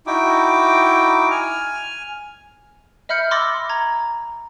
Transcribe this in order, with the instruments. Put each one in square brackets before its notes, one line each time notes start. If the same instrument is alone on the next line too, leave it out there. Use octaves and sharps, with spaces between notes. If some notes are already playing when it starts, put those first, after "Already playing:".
[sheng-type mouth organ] D#4 E4 F#4 G5 D6
G#5 F6
[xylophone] D#5 E5 B5 F6 G6 C#7
B5 C6 D6 E6 A6 A#6
A#5 G#6